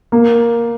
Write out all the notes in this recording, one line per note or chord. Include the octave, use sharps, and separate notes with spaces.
A#3